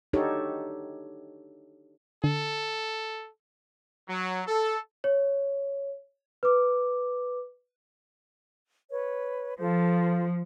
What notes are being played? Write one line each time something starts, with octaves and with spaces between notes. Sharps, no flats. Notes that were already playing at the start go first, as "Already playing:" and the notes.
D4 D#4 F#4 G4 A4 C#5
D3 A4
F#3
A4
C#5
B4 D6
B4 C#5
F3 F4 A4 C5